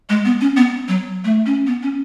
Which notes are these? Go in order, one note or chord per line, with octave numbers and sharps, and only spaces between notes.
G#3
B3
C#4
B3
F#3
A3
C#4
B3
C#4